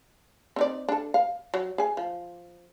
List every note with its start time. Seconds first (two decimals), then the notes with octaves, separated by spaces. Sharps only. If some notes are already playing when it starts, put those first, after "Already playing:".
0.56 C4 D#4 D5
0.89 D4 A4
1.14 F5
1.54 F#3
1.78 G#4 G#5
1.97 F3